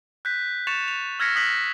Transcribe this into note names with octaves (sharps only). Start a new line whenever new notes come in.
F#6 G6 B6
C#6 A6 C#7 E7 F7
F7
E6 F6 G#6 A#6 B6 C#7
D#6 F#6 A#6 B6 F#7